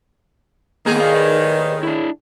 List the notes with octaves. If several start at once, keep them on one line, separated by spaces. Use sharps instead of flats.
D#2 A2 D#3 A#3 B3 G#4
A#4 D5 F5
B4 D5
D4 E4